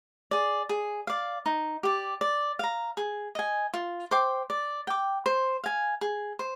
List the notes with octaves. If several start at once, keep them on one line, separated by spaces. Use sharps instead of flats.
G#4 D5
G#4
D5 F5
D#4
G4 D5
D5
F5 A#5
G#4
D#5 G#5
F4
C5 G5 D6
D5
G5 D6
C5
F5 G#5
G#4
C5